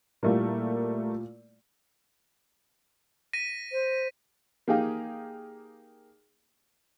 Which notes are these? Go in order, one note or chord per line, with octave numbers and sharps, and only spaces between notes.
A#2 G3 A3 A#3 E4 F4
A#6 B6 D#7
C5
A#3 D#4 G4 G#4 F5 G5